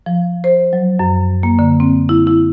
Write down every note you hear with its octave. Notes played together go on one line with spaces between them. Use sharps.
F3
C5
F#3
F#2
A#3
D3
C4
E4
E4